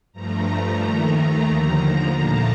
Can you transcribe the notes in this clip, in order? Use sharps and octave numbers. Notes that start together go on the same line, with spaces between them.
G2 F3 A3 A#5
D#2 D#3 A3
D#2 D3 F3
A#2 F3 A3 A5